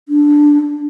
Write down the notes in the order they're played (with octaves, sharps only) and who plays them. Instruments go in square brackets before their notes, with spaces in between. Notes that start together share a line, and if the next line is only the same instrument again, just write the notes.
[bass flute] D4